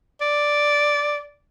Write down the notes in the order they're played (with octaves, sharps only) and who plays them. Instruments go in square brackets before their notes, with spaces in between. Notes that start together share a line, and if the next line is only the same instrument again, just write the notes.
[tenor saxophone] D5